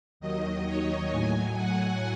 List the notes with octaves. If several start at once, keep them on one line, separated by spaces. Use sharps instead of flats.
D#2 D#3 F#3 D#5
C#5
A2 F#3 G#5
F#5